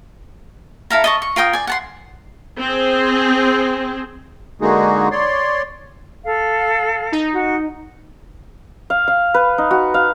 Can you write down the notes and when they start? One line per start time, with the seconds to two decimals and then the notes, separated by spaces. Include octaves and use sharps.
0.90 E4 A4 F5 A#5
1.04 D#5 A5 C#6
1.22 C#6
1.36 F4 A#4 G5 D#6
1.53 D5 G#5
1.67 F#5 A5 C6
2.58 C4 G#4
4.61 D3 G#3 A#3 D#4 F#4 G#4
5.11 C#5 D5 C6
6.24 A4 F5
7.12 D#4
7.34 F#4
8.90 F5
9.08 F5
9.34 B4
9.58 D#4
9.71 F#4
9.94 F5